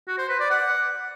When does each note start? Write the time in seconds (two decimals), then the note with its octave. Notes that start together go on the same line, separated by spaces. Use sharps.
0.08 F#4
0.18 C5
0.29 B4
0.40 D5
0.51 F#5